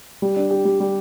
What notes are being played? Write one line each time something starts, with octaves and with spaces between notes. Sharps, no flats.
G3
D4
G4
G3
G3